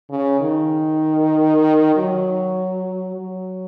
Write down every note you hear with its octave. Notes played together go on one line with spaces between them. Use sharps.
C#3
D#3
F#3
F#3